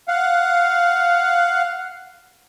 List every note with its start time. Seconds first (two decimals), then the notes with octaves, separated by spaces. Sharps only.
0.08 F5 F#5